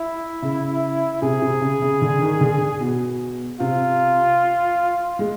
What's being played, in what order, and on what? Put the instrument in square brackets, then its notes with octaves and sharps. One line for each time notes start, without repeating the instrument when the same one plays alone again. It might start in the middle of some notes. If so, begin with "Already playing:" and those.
Already playing: [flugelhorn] E4
[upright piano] C#3
[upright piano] C3 [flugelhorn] G#4
[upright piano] C3
C#3
C#3
D3
D#3
D3
B2
[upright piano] C3 [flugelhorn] F4
[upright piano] G#3